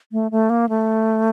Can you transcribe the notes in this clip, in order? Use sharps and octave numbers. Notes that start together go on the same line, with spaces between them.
A3
A3
A#3
A3